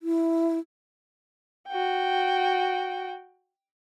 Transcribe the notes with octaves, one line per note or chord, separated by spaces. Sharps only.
E4
F#4 G5